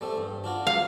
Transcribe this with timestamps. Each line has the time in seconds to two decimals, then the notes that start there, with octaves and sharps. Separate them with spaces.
0.01 G3 A3 C4
0.18 G2
0.44 D4 F4 F#4
0.67 F5